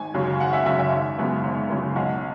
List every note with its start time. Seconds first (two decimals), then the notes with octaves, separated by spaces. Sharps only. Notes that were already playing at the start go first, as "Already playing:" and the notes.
Already playing: G#1 G#5
0.14 F#2 C#3 F#3
0.39 G#1 F#5
0.53 E5
0.66 F#2 C#3 F#3 E5
0.79 E5
0.91 G#1
1.18 F#2 C#3 G#3 B3
1.44 G#1
1.69 F#2 C#3 G#3 B3
1.95 B1 F#5